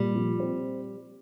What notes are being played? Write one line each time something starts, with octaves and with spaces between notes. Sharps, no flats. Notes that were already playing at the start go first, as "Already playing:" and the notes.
Already playing: A#2 G3
F3
C4